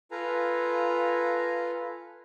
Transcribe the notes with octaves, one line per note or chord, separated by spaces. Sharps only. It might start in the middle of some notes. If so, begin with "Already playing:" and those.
F4 A4 B4 F5 G#5 A#5